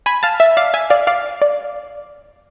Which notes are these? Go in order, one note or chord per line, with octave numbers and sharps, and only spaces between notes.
G#5 B5
F5 A5
E5
D5 F5
E5 G#5
D5 F5
D5 F5
D5